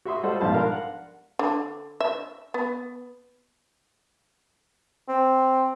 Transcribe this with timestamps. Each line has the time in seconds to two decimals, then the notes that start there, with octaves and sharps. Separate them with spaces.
0.05 F#4 E5 C6 D#6
0.23 G3 F4 A4 C5 D#5 F#5
0.41 B1 G#2 F3 G3 A5 C6
0.53 D4 A#4 F5 A5
0.72 F#5
1.39 D3
2.00 E5
2.54 B3
5.09 C4